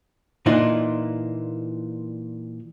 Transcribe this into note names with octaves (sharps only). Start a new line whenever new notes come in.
A#2 E3 D4 D#4 F4